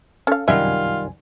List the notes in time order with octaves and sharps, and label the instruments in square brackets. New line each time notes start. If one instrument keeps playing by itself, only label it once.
[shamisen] C#4 F5 [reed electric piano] A4
[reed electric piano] C2 F#2 G#5 [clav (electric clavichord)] D#3 G3 F#5 [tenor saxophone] F4 [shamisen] E5